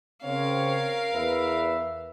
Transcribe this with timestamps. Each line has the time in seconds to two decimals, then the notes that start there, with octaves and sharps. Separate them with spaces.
0.24 C#3 C4 A#4 C#5 F5
1.14 E2 B4 E5